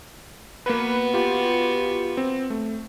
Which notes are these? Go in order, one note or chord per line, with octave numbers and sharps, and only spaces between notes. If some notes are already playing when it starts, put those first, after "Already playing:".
A#3 B3 F#4 B4
F4 G4
C4
A3